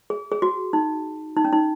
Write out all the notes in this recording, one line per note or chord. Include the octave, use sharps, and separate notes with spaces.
G#4
G#4
F#4
D#4
D#4
C#4
D#4